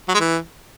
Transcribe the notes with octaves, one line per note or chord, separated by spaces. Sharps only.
F#3
G#3
E3